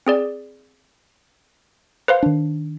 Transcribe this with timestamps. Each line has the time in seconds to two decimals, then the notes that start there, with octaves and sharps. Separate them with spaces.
0.07 C4 G#4 D5
2.08 B4 C5 F5
2.23 D#3 D4